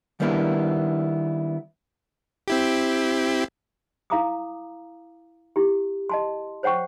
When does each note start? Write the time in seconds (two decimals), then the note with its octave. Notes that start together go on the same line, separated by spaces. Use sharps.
0.20 D#3 G3 A#3 B3 D4 E4
2.48 C4 E4 G4
4.10 E4 F5 A#5 D6 D#6
5.56 E4 G4
6.10 D#5 A5 C6
6.63 C5 C#5 F#5 G5 C#6